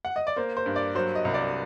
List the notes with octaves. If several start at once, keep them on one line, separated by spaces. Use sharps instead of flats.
F#5
D#5
D5
A#3 C5
C5
G2
D5
F#3 C5
D#5
C2
D5